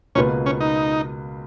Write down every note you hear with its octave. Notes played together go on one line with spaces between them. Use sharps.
C#2 B2 A#3 C#4 F4 B4
C#4
D#4